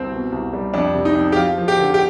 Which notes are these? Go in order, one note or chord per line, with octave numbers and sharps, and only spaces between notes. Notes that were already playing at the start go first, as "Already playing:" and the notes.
Already playing: C2 C4
B2
C2
G3
F2 D4
C3
D#4
F2
G4
F3 F4
F3
G4
D3
G4